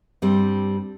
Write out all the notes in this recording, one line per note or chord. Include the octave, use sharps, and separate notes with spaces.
G2 G3 C4